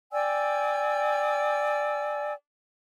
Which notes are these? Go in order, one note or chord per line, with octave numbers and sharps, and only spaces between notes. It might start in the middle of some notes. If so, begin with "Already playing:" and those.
D5 G5 G#5 E6